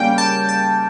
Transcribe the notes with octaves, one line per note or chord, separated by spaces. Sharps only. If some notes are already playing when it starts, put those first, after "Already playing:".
Already playing: C#3 G3 A#3 C#4 G5
A5
A5